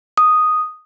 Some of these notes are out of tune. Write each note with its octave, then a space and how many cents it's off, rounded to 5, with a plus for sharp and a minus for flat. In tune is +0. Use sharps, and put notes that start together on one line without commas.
D#6 -5